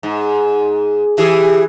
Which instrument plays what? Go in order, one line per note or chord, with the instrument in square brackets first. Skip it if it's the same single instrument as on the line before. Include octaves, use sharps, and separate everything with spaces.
[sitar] G#2
[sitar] E3 G#4 [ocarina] G4